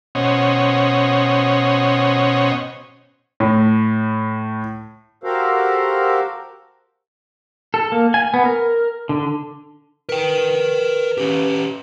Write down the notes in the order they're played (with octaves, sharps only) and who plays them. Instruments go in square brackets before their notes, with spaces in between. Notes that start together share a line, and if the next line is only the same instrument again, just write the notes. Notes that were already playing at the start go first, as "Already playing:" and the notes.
[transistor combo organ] B2 C#4 C5 C#5 D#5 F#5
[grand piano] A2
[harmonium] F#4 G4 A4 A#4 C5 F5
[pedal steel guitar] A4
A#3
G#5
B3
A#4
D3
[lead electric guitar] A#4 G5 [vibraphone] B4
[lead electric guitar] C#4 G4